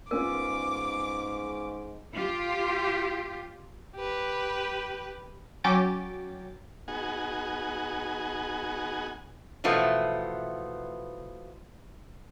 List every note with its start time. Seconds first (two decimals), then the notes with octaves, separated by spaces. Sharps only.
0.11 G#2 B3 C#4 F4 A#4 D6
2.14 F4 G4
3.96 G4 B4
5.64 F#3 C#4 G5 D6 A6
6.88 B3 D#4 F#4 G#4 F#5 G#5
9.64 B2 E3 F3 A3 B3